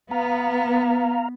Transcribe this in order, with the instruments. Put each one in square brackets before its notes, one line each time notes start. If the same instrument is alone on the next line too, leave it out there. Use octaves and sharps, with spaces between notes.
[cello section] B3 [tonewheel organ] F5 A#5